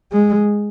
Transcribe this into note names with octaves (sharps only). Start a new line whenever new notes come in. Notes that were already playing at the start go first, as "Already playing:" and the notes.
G#3